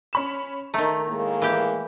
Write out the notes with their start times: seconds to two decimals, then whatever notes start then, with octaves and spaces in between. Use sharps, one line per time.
0.13 C#4 B5 E7
0.74 D#3 A3 A#5
1.08 A2 G#3 A#3
1.42 E3 G4